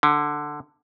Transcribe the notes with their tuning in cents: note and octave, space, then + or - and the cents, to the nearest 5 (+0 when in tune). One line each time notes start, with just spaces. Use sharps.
D3 +10